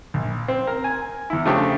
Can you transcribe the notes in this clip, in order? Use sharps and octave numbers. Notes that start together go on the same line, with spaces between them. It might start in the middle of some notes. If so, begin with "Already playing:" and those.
A#1
C4
A#4
G#5
E2 E4
C#3 F3 A3 D4 G4 C5